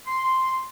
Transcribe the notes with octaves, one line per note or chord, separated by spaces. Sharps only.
C6